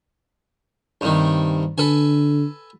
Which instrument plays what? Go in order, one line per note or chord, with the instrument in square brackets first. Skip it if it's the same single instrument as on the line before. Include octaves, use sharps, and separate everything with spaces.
[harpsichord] G2 C3 D#3
[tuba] D3 [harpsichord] A4 B4 G#5